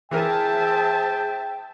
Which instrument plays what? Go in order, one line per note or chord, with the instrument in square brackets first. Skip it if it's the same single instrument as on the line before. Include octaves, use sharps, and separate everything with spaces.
[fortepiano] E3 A#4 [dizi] G#4 [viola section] C5 E5 A5 [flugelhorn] G5